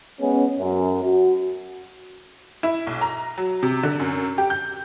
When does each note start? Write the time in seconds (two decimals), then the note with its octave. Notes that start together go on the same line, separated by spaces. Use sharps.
0.20 G#3 B3 C#4
0.59 F#2
1.02 F#4
2.63 E4
2.87 B1
3.01 A#5
3.38 F#3
3.63 C3
3.83 D3
4.00 F#2
4.38 G4
4.50 G6